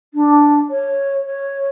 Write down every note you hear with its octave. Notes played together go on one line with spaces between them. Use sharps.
D4
C#5
C#5